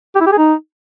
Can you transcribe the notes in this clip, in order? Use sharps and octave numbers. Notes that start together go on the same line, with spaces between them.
G4
E4
G4
G#4
D#4